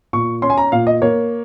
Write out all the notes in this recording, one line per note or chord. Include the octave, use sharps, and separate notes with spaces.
A#2 C#6
C#4 C6
G#5
A#5
A#2 F5
D#5
A#3 C#5